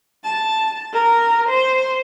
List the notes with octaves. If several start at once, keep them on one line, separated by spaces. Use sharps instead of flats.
A5
A#4
C5